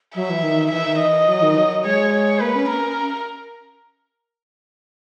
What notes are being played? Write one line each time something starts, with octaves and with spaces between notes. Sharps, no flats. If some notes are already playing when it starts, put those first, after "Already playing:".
F#3 E5
E3
D#3
E3 E5
D#3
E3 D#5
F#3
D#3
F#3
G#3 C#5
C#5
A#3 B4
C#4
C#4 A#4